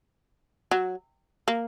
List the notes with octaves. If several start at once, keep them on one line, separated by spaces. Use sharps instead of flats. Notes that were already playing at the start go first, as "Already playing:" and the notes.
F#3
A#3